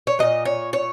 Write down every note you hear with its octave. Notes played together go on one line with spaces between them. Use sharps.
C#5
A#2 F#3 D#5
C#5
C#5